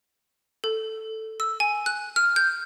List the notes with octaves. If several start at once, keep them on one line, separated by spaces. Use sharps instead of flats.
A4
E6
G#5
F#6
F6
G6